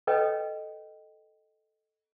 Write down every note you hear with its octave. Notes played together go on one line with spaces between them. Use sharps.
A4 B4 C#5 D#5 G5